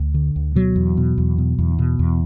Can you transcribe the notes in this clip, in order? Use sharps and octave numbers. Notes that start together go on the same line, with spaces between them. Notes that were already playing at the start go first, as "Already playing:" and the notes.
Already playing: D2
D3
D2
B2 F#3
E2
B2
E2
B2
E2
B2
E2